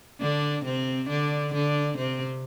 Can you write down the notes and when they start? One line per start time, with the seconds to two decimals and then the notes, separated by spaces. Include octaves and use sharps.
0.21 D3 D4
0.65 C3 C4
1.09 D3 D4
1.54 D3 D4
1.98 C3 C4